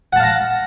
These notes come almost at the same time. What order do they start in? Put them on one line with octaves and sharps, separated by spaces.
F#5 A5 F5 A#5